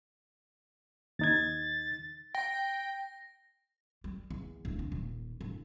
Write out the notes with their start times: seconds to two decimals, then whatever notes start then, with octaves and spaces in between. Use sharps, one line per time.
1.19 D#2 D#4 G#6 A6
2.35 G5 A#6
4.04 G3
4.30 E2
4.65 D1
4.79 D3
4.92 D#1
5.41 D1